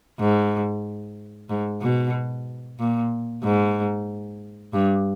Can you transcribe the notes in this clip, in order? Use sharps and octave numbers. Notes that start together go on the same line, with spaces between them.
G#2
G#2
B2
A#2
G#2
G2